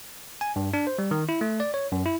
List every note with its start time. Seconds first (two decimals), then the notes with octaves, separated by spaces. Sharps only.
0.41 G#5
0.56 G2
0.74 D4
0.87 C5
0.99 G3
1.11 D#3
1.29 E4
1.41 A3
1.60 D5
1.74 C#5
1.92 F#2
2.06 E4